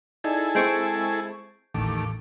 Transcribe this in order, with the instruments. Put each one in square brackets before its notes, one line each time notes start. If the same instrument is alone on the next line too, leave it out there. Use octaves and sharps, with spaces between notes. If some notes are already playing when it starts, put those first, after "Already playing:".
[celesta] D#4 D5 D#5 [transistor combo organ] E4 G#4 A4
[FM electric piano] G#3 C4 C#6 [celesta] G6 C7 D7
[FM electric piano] A1 [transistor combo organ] D#2 A3 D6